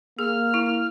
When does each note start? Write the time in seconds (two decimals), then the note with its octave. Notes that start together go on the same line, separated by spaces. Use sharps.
0.19 A#3 G#4 F6
0.54 E4